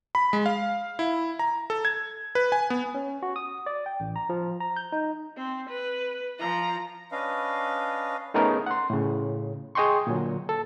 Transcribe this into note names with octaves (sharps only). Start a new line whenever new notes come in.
B5
G#3
F5
E4
A#5
A4
G#6
B4
G#5
B3
C#4
F#4
D#6
D5
G5
A1
A#5
F3
A#5
G6
D#4
C4
B4
F3 A#5
C#4 D4 B4 D#5 F5
A3 B3 C#4 D#4 G#4 A#4
F#5 C6
A2 C#3
G#4 D#5 G5 C6 C#6
A#2 D3 F#3
A4